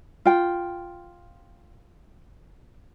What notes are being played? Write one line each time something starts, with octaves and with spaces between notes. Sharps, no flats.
F4 G5